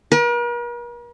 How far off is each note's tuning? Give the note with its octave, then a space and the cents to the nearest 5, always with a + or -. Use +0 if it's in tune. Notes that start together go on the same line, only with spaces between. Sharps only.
A#4 +45